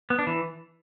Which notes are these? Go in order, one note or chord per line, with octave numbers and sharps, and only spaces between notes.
B3
D4
E3